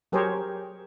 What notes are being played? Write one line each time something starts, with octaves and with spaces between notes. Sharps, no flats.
F#3 G4 G#4 A#4 C5 C#5